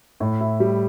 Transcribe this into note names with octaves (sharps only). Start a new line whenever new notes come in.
A2
E4
G3